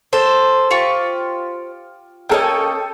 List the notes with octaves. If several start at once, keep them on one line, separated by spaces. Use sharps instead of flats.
A4 C5
F4 G4 C#6
A#3 C#4 A4 D#5 G5